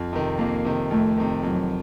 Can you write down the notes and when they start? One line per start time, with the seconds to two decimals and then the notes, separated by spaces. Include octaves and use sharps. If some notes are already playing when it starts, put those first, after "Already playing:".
Already playing: F2
0.13 C3 D#3
0.38 F2 A#3
0.65 C3 D#3
0.91 F2 A3
1.18 C3 D#3
1.43 F2 F#3